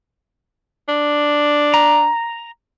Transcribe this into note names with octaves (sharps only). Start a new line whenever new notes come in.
D4
A#5